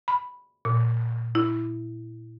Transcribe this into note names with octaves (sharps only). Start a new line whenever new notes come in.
B5
A#2
E4